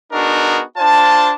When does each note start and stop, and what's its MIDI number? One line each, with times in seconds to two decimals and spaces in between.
0.13 0.62 59
0.13 0.62 62
0.13 0.62 63
0.13 0.62 66
0.13 0.62 68
0.13 0.62 70
0.77 1.33 62
0.77 1.33 65
0.77 1.33 72
0.77 1.33 81